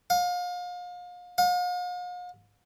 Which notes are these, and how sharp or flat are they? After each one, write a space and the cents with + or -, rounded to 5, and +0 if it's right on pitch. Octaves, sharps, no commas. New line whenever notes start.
F5 +35
F5 +45